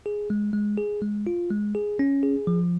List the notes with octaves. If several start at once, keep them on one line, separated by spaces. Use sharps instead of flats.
G#4
G#3
G#3
G#4
G#3
F4
G#3
G#4
C#4
G#4
F3